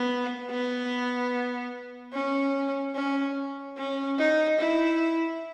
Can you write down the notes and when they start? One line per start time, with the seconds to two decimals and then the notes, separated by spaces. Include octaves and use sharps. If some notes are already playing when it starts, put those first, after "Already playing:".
Already playing: B3
0.50 B3
2.14 C#4
2.95 C#4
3.77 C#4
4.18 D#4
4.59 E4